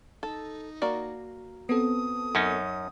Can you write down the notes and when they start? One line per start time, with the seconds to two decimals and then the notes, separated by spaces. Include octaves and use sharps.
0.23 D#4 A4
0.82 A#3 F#4 D5
1.69 B3 C4 A4 D#6
2.35 F#2 C#4 D#4